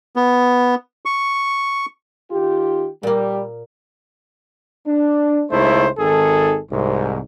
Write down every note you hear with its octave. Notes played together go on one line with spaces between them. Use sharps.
B3
C#6
D#3 F4 G4
A#2 G3 A#3
D4
C#2 C#3 A3 D#4 E4 C5
G#1 D#3 G#4 A4
C2 G#2